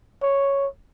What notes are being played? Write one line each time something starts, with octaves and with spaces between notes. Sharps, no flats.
C#5